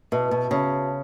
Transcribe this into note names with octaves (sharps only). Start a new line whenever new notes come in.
B2 F#4 B4 E5 A5
B2
C#3 F#4 B4 E5 A5